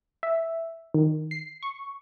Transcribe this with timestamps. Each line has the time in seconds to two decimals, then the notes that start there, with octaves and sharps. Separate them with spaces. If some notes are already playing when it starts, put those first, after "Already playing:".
0.23 E5
0.94 D#3
1.31 C7
1.63 C#6